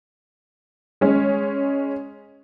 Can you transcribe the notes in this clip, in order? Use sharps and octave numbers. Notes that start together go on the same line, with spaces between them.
G#3 C#4